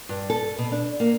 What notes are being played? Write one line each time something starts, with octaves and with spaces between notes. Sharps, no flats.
G2
A4
B2
D4
A#3